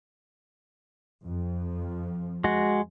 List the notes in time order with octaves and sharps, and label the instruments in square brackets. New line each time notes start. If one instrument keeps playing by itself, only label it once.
[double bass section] F2 F3
[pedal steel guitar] G#3 F#4